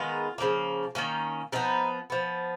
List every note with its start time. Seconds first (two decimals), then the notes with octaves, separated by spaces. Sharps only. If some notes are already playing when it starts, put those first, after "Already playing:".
Already playing: D#3 G#3 B3 F4
0.38 C#3 F3 A#3
0.95 D#3 A#3 C#4
1.52 F3 B3 D#4
2.10 F3 B3